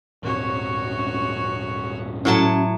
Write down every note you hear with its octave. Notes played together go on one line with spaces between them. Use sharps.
D#1 G#1 C3 F#4 C#5
A2 F#3 C#4 E4 F#4 A5